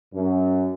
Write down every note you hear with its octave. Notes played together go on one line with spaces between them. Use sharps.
F#2